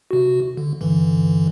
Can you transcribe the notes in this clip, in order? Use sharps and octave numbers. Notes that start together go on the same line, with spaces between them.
C3 F#4
D3
G2 D3 E3